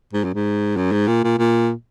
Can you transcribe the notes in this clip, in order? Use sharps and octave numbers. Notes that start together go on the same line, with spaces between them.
G#2
F#2
G#2
F#2
G#2
A#2
A#2
A#2